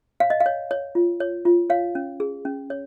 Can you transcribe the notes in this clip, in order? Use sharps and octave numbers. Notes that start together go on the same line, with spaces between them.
C#5 F5
D#5
F5
C#5
C#5
F4
C#5
F4
C#5 F5
C#4
G#4
C#4
C#5